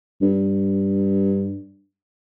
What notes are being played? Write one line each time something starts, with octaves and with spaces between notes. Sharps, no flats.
G2